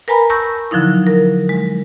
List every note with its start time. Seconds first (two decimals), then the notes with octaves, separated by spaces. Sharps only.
0.08 A#4 B4 G#5 A#5 B5
0.30 A5 C#6 E6 G6 A#6
0.71 D3 F3 F#3 D#4 E4
1.07 A#4
1.49 G#3